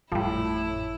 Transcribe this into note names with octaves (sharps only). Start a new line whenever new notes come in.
G#1 F2 A2 F3 G3 E4